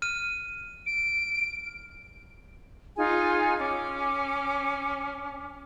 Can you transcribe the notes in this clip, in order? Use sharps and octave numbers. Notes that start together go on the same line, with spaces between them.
F6 D#7
D7
D#4 F4 G#4 G#5
C#4 D6